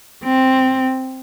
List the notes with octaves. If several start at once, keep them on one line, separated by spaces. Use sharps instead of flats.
C4